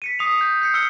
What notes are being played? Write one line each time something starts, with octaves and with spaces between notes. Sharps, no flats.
B6 C#7 D#7
D#6 C7 F7
G6
G6 C7 C#7
E6 F6 G6 C#7 G7